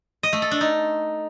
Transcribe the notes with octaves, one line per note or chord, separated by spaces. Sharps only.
D#5
A3
A4
D4
D#4